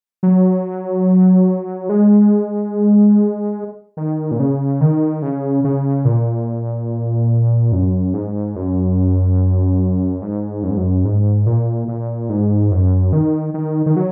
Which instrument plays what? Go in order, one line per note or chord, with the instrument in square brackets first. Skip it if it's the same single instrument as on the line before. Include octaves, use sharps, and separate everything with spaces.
[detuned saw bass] F#3
G#3
D#3
A#2
C#3
D#3
C#3
C#3
A#2
F#2
G#2
F#2
G#2
F#2
G#2
F#2
G#2
A#2
A#2
G#2
F#2
D#3
D#3
D#3
F#3